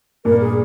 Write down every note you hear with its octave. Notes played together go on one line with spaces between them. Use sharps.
G2 A#2 A#4
G#4